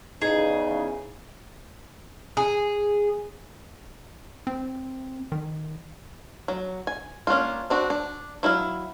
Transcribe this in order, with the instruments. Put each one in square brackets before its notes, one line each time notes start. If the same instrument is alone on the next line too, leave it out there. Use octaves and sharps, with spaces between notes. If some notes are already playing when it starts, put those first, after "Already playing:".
[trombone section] E2 C#3 [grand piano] D#4 [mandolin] G#4
[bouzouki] G#4
[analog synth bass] C4
D#3
[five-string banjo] F#3
G#5
A#3 C#4 D4 F4
C4 D4 F#4
D4
F#3 E4 A#4 F5